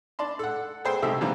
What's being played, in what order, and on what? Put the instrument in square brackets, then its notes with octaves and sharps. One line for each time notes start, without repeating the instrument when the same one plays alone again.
[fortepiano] D4 D5 A5 C6
A4 F#5
G#4 A4 C5 G5 C6 E6
C2 D#4 G4 A4 E5
D3 E3 F#3 G3 A#3 C4